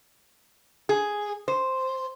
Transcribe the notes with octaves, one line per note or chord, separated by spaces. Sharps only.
G#4
C5